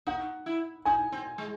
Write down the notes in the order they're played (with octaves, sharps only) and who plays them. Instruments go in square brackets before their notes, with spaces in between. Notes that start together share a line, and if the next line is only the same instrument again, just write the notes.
[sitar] D#4 [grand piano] F#5
[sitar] E4
[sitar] D#4 [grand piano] G#5
[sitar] C4
G#3